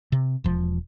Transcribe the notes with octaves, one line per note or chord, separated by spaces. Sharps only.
C3
E1 F3